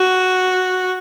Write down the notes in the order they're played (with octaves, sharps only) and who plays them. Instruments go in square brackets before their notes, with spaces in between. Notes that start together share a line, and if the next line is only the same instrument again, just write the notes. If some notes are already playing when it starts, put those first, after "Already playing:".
Already playing: [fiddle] F#4